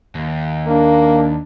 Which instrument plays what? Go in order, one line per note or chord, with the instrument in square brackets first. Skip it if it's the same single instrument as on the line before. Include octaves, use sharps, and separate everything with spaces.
[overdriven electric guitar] D#2
[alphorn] A#3 [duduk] D4